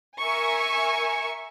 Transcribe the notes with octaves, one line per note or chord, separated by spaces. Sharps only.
A#4 E5 G#5 C#6